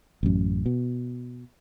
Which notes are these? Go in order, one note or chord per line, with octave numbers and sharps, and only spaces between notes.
A1 F#2
B2